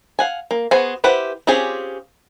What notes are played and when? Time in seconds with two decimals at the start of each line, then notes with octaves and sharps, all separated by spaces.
0.19 F5 F#5 G#5
0.51 A#3
0.71 B3 F#4 G#4 C5 G#5
1.04 E4 G4 B4 C5 F#5
1.47 C4 C#4 F4 G4 G#4